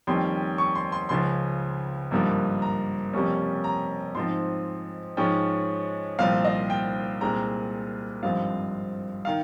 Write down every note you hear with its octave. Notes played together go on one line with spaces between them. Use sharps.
F2 D#3 G3 A#3 C#4 C6
C#6
C6
C6
C#2 C#3 F3 C6
G#1 G2 F3 A#3
A#5
F2 C3 G3 A#3 C#4
A#5
G#2 F3 C4 C6
G#2 F3 G#3 C#4 G5
C2 A#2 F3 C4 F5
D#5
G5
C2 A#2 G#3 C4 A#5
G#1 G2 F3 C4 F5
D#3 F5